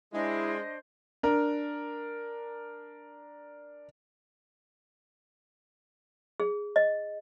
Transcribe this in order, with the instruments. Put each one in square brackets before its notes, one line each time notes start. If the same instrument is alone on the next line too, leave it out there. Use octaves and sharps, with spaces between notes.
[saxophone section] G#3 [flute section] D4 C5 D#5 [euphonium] E4
[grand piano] D4 A#4
[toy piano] G#4
D#5